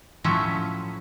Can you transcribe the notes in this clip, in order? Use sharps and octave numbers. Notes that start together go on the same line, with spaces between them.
A2 F3 F#3 A3 C#4 E5